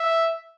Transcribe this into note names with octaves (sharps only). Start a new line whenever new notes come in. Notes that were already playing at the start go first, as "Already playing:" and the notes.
Already playing: E5